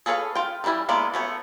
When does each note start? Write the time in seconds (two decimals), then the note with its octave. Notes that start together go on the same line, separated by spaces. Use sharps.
0.06 G#4 A4 B4 C#5 F5
0.35 F4 G5
0.64 D#3 E3 G3 E4 G#5
0.89 G#3 A#3 B3 E4 D5
1.14 A3 B3 C#5